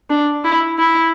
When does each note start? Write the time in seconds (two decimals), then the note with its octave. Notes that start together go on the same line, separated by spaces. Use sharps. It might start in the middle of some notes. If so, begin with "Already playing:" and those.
0.10 D4
0.44 E4
0.79 E4